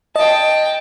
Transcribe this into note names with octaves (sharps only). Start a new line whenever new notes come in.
D#5 G5 A5